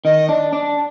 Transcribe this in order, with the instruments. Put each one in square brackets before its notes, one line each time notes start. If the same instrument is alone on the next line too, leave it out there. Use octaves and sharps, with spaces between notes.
[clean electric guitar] D#3 [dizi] D#5
[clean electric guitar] D4
D4